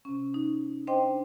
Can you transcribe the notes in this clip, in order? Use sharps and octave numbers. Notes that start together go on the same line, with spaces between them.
C3 C#4
D#4
D4 C5 D#5 G5 C6